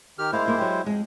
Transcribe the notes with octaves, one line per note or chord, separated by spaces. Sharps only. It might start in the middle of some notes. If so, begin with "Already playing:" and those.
D#3 G4 F6
G#3 A#3 E4 C5 F5
G2 A#3 F4
F#3 G4
F2 G#3